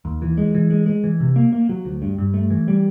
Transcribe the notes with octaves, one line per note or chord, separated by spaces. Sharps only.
D#2
E3
G#3
E3
G#3
G#3
E3
C3
A#3
A#3
F#3
D2
G2
G2
A3
E3
G3